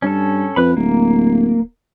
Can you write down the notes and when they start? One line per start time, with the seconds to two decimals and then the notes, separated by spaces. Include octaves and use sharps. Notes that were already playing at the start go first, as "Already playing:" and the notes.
0.02 G2 C#4 A4
0.56 F2 B4 B5
0.77 D1 A#3